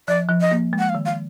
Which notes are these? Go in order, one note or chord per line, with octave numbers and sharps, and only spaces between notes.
F3 D5
F3
D#5
A#3
G#3
F#5
F5
D#3
F5